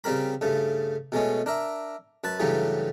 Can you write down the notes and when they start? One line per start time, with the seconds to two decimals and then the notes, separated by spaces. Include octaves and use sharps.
0.04 C#3 G3 C4 A#4 B5
0.41 G2 C#3 A3
1.12 B2 G#3 A3 C#4
1.46 D4 A#4 E5
2.24 F#2 B4 A5
2.40 G2 C#3 E3 F#3 G3 A3